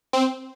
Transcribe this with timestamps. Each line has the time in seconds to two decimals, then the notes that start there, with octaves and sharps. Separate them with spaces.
0.13 C4